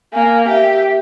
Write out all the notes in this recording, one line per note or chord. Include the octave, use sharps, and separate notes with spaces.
A#3 G#5
G4 E5